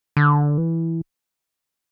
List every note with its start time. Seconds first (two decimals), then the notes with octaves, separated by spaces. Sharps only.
0.17 D3
0.58 E3